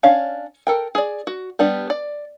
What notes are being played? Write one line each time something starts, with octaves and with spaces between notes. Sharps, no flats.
C#4 D4 C#5 F5
A4 A#4 G5
G#4 D5
F#4
G3 B3 D4 G4
D5